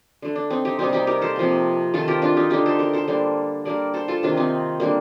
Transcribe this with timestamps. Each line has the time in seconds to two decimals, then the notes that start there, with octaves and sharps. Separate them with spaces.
0.22 D3 A3
0.36 D4
0.50 C4 D#4
0.65 D#4 G4
0.79 C3 G3 A#3 C4 D#4
0.93 D#4 G4
1.07 G4 A#4
1.21 A4 C5
1.36 C3 F3 A#3
1.94 D#3 A3 F4 A4
2.08 G4 A#4
2.22 D4 F4
2.37 D#4 G4
2.50 D3 A3 D#4 G4
2.66 A4 C5
2.79 G4 A#4
2.93 A4 C5
3.08 D3 G3 A#3
3.65 D3 G3 A#3 A#4 D5
3.94 A4 C5
4.08 F4 A4
4.23 C3 D#3 A#3 D4 F4
4.37 C4 D#4
4.80 D3 G3 A#3